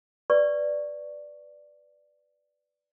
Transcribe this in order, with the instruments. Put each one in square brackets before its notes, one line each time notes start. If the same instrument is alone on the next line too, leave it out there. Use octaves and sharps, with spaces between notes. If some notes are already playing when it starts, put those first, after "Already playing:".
[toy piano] B4 D5 C#6